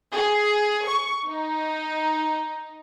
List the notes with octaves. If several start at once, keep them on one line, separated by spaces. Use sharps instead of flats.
G#4
C#6
D#4